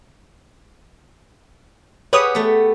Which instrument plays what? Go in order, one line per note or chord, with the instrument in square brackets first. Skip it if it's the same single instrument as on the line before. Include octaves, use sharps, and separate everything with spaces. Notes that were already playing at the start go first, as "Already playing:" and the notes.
[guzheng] G4 G#4 F#5 [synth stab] B4 C#5 D#6
[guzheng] A3 B3